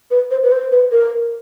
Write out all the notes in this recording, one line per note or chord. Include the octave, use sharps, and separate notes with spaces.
B4
C5
B4
C5
B4
A#4